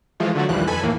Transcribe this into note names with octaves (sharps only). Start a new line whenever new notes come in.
E3 F3 G#3 A3 F4
D3 F#3 A3 F#4
A#1 D#2 E3 F3 G3 F#6
F2 A4 B4 G#5 B5
D#2 A2 E3 A#3